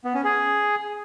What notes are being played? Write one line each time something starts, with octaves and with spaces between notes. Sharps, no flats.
B3
C#4
G#4